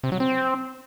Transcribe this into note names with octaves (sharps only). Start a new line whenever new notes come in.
C3
F#3
C4